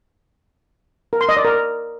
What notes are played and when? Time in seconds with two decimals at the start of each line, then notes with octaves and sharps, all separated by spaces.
1.13 A#4
1.21 C6
1.29 D#5
1.37 D5
1.45 A#4